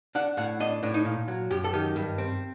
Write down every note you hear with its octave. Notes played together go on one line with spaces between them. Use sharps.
D4 F#5
A2 F#5
D4 D#5
A2 D4
D#4
A#2
F#3
F#2 G4
A4
D#3 G4
G2
C4